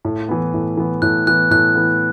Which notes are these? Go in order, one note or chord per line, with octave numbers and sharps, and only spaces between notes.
A2
E3 B3
A2
E3 B3
A2 F#6
E3 B3 F#6
A2 F#6
E3 B3